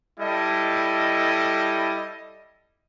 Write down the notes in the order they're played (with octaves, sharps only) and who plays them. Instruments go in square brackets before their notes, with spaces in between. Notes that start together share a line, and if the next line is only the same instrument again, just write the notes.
[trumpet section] G3 E4 A4 D#5